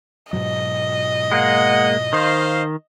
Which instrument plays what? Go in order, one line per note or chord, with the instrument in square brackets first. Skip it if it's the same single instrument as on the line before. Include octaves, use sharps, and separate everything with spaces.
[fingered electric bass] G#2 B2 F#3 [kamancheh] D#5
[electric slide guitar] G#3 A#3 [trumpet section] F#5
[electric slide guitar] D#3 [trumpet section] C5 F5